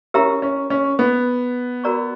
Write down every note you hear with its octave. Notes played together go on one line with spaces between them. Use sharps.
C#4 E4 G4 A#4 E5 A#5
C#4
C#4
B3
F#4 A#4 D5 A#5 C#6